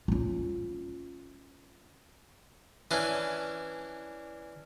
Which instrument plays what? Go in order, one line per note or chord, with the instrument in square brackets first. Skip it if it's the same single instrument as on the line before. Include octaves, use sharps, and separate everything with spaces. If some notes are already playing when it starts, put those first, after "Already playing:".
[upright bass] C#4 F4
[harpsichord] E3 C#4 D4